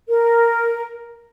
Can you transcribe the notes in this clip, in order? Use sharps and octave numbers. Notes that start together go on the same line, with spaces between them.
A#4